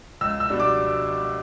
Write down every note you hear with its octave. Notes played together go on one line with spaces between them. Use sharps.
C#2 E6
E6
B2 G3 D4
D6